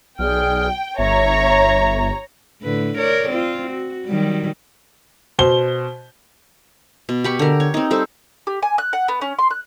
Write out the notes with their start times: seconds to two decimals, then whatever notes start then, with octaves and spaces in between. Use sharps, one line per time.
0.19 B1 G#4 D5 G5 F6
0.99 G1 C#5 E5 A#5
2.62 A2 D3 B4
2.98 A#4 C#5 D5
3.29 C4 F4
3.71 F#4
4.06 D#3 F#3 G3
5.39 B2 C5 G7
7.09 B2
7.24 G4 B5 C#6
7.39 D3 A#4
7.60 C#5
7.74 C4 D#4
7.91 G3 A4 C5
8.47 G4
8.63 G#5
8.78 F#6
8.93 F#5
9.08 B3
9.21 C#4
9.39 C6
9.51 F#6